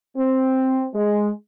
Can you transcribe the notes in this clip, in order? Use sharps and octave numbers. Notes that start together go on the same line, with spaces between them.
C4
G#3